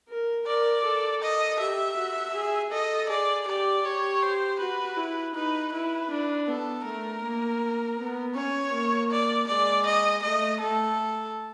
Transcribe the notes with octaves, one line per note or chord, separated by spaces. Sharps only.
A#4
A#4 D5
A4
D#5
G4 E5
F#4
G#4
A4 D#5
G#4 D5
G4 D5
G4 C#5
C5
F#4 B4
E4
D#4 B4
E4 B4
D4
B3 A4
A3 A#4
A#3
B3
C#4 C#5
A#3
D5
G#3 D5
D#5
A3 D#5
A3 A4